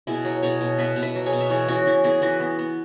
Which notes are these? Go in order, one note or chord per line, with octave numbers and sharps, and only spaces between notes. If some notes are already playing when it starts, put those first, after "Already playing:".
B2 E4 G#4
F#3
B2 G#4 C#5
B2
B3 B4 E5
B2
B4 E5
F#3
G#4 C#5
B2
E5
E3 G#4 C#5
E3 C#4 F#4
E3 E4
B3 E4 G#4
E3 F#4 B4
B3
B3